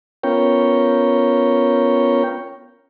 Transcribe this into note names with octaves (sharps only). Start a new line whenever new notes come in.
B3 C#4 F4 A#4 C#5 G5